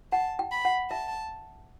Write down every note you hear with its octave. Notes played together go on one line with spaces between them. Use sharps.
F#5 A5
G5
B5
F#5
E5 A5